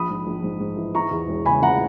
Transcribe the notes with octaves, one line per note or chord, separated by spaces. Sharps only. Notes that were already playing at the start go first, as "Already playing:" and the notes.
Already playing: A#1 B5 D#6
G#2
A#1
G#2
G#2
E3
E3 A#5 C#6
E2
E1
C#3 G#5 B5
E3 F#5 A#5